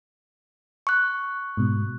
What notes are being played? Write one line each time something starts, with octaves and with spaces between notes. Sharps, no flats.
C#6 F#6
G#2 B2